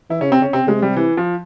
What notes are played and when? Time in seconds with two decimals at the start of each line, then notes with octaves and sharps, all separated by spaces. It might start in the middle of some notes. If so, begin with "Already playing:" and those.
0.10 E3 E4
0.21 C#3 C#4
0.31 C3 C4
0.41 C#3 C#4
0.53 C3 C4
0.66 C#3 G#3
0.75 C3
0.82 G3
0.97 E3
1.17 F3